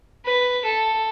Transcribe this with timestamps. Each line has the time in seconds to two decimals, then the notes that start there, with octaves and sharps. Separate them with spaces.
0.25 B4
0.64 A4